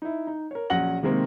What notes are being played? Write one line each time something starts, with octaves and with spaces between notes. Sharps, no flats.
D#4 E4
D#4
A#4 C#5
A#1 F#3 C#4 F#5 A#6 F#7
C3 D#3 G#3 A#3 C4